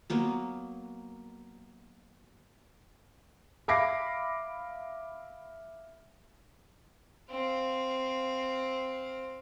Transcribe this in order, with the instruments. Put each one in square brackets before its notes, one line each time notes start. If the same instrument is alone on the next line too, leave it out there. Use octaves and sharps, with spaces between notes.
[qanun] F#3 A#3 B3
[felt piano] E5 F5 B5 D6 A#6 C7
[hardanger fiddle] C4 F5